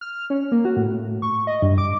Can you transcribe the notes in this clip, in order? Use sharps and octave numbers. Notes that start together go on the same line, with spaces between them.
F6
C#4
A#3
F#4
A2
C#6
D#5
G2
D6